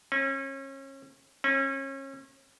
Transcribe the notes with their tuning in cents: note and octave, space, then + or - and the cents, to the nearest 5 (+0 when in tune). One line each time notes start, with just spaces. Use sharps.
C#4 -30
C#4 -30